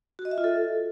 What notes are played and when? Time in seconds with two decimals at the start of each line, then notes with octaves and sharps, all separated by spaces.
0.19 F#4
0.25 D#5
0.31 E5
0.38 F4
0.44 A4